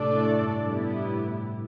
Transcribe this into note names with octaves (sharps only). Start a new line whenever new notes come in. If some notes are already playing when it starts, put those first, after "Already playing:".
Already playing: A2 C3 A3 D4 A4 D5
A2
G2
G2 B3 E4 G4
A2